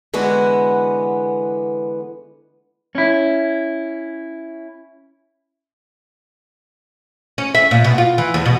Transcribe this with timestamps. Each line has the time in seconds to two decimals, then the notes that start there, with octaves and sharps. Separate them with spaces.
0.14 D3 E3 G#3 B3 F#4
2.95 C#4 E4
7.38 C#4
7.55 E5
7.71 A#2
7.84 B2
7.98 F4
8.18 E3
8.34 E2
8.46 B2